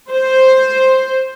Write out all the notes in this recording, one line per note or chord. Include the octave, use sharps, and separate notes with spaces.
C5